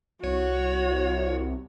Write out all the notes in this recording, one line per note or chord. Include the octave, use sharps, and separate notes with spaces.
C2 F#4 C#5